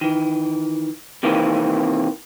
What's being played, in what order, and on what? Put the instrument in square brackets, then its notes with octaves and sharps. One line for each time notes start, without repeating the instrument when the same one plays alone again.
[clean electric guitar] D#3 E3
C3 D#3 E3 A#3 C4